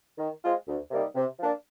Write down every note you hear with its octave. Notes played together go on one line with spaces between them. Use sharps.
D#3
G#3 C4 F4
D2
C3 G3 A#3 D#4
C3
F3 A#3 D4